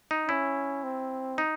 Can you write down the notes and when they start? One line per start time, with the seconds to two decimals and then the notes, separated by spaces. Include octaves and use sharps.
0.11 D#4
0.28 C#4 E4
0.84 C4
1.38 D#4